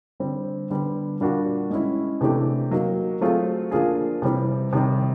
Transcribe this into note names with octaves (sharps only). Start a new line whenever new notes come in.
D3 G3 C4
D3 G3 B3
A#2 G3 A#3 D4 F#4
G#3 C#4 E4
C3 E3 A3 D4 G4
F#3 A#3 D#4
F#3 A3 C4 F4 G#4
F3 A#3 D4 F4 G#4
C3 E3 G3 C4
C3 D#3 G3